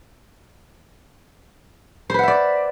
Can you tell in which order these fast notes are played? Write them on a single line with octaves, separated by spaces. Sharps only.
C5 B4 F#5 E5 D5